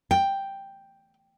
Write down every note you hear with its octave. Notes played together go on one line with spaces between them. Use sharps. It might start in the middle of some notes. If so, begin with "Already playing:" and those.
G5